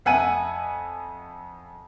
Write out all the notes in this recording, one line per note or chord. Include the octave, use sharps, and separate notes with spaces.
F2 E5 F#5 G#5 D#7